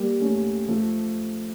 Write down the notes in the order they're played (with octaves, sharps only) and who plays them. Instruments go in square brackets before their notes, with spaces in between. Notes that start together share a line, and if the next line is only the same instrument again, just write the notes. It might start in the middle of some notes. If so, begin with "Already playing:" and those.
Already playing: [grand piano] G3 A#3
A3 C#4
F3 A3